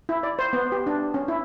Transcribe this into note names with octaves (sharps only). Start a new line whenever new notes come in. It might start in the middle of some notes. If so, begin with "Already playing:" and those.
E4
D5
C5
B3
G4
D4
C#4
E4